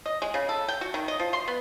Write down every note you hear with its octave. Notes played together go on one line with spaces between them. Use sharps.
D#5
G#3
C#3
A4
G5
F#4
D#3
D#5
F3
C6
B3